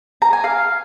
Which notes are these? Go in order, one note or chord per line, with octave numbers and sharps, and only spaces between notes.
A#5
G#5
F5